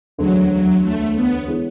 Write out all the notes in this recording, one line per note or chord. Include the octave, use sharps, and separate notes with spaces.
E1 D2 D3 F#3 G#3 C#4
F#3
A3
B3
E3 G#3 C#4 G#4